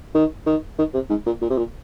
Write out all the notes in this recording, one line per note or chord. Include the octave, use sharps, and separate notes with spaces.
D#3
D#3
D#3
C3
G#2
A#2
A#2
C3
A#2